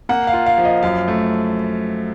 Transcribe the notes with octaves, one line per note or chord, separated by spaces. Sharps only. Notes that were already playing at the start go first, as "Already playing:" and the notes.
A#3 F#5
F5
F4
F5
F3
D#5
F#2 F5
A3